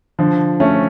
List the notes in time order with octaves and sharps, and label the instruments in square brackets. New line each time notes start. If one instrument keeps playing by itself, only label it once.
[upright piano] D3 F3
A3 C#4